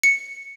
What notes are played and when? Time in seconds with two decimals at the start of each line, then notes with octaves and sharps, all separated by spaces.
0.03 C#7